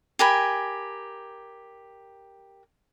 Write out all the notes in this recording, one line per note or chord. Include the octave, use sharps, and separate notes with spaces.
G4 A#4 G#5 B5